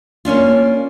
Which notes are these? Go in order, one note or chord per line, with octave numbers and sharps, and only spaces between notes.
A#3 C#4 D4 F4